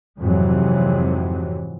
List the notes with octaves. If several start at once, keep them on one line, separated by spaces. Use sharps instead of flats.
F2 G#2 C3 E3 F#3